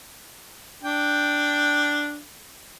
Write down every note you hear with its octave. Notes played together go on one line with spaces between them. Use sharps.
D4 G5